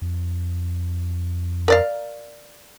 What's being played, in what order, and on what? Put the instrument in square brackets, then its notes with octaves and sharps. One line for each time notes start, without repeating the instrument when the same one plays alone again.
[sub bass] F2
[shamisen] A#4 D5 F5